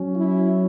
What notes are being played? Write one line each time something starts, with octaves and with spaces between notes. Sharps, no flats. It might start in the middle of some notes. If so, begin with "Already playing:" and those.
Already playing: F#3 C#4
E4